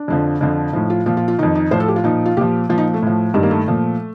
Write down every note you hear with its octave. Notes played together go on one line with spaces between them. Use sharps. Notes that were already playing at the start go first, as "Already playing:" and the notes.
Already playing: D4
F2 D3 F3
F2 D3 F3
A2 F3 D#4
F4
A#2 F3 F4
F4
F4
F2 D#3 D#4
D#4
A2 F3 C5
A4
G4
F4
A#2 F3 D#4
F4
A#2 F3 G4
A#2 F3 F4
D#4
A3
A2 F3
G2 D#3 G3
A#3
A3
A#2 F3